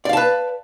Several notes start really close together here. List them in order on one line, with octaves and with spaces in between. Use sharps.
D5 F5 A5 B4